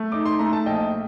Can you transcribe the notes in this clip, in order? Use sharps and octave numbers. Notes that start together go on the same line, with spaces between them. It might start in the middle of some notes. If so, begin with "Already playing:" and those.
Already playing: A3
D#4 D6
C6
A3 A#5
A5
A#1 D#5 G5